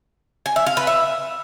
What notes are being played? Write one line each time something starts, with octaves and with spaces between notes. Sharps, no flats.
G#5
E5
F5
B4
E5